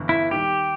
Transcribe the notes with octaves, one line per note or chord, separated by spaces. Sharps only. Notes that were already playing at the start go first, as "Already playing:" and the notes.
Already playing: G1 G2 E3
E4
D#2 D#3 G3 G4